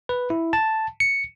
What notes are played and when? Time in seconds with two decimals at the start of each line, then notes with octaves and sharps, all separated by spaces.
0.09 B4
0.30 E4
0.53 A5
1.00 C#7